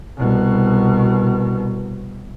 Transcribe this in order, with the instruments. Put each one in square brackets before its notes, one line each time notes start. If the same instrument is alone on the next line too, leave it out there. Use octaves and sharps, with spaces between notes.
[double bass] C2 B2